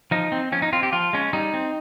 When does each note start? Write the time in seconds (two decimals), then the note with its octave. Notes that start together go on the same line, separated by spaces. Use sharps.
0.11 F3 D#4
0.32 C4
0.52 F3 C#4
0.62 D#4
0.73 C4 F4
0.83 G4
0.93 F3 F4
1.13 G#3 C#4
1.33 G3 D#4
1.54 C4